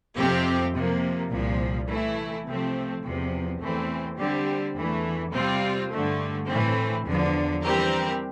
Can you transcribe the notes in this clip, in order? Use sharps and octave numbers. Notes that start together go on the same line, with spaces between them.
F2 C3 F3 C4 G4
C3 F3 A#3
C2 A#2 F3
E3 A3 E4
C3 F3 A3 C4
E2 C3 F3
E2 E3 A3 C4
D3 G3 C4 G4
E2 E3 A3
C3 G3 C4 F4
G2 D3 A3
A2 E3 A3 C4
E2 D3 F3
E3 G3 C4 G4 A#4